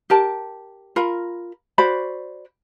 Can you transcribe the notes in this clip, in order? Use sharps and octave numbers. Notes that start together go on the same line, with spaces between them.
G4 A#4 A5
F4 A#4 B5
F#4 C5 D5 B5